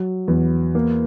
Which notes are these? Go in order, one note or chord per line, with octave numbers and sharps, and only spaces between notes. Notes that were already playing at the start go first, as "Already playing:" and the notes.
Already playing: F#3
E2
A#3